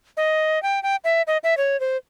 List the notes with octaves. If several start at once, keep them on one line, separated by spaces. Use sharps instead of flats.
D#5
G5
G5
E5
D#5
E5
C#5
C5